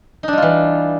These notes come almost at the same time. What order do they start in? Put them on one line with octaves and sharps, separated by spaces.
D#4 D4 G3 F4 E3